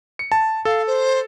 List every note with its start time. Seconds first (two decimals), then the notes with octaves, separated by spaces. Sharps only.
0.19 C#7
0.32 A5
0.65 A4 F5
0.87 C5